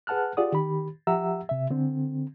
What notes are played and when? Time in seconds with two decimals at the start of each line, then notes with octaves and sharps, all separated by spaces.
0.07 G#4 B4 F#5 A5 F6 F#6
0.37 F4 G4 G#4 D5 F#5 D#6
0.53 D#3 G4 B5
1.07 F3 G4 E5 F#5 A#5 E6
1.49 C3 E5
1.70 D3 C4